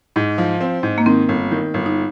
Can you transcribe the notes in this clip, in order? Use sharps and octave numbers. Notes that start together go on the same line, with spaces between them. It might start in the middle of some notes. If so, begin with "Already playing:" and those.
G#2
F3
C4
G#2
A#3
D#3 C4
G1
D#3
G1
D#4